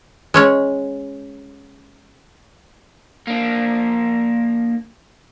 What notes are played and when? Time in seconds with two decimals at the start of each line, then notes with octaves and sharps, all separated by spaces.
0.34 G#3 C#4 C#5
3.27 A#3 D4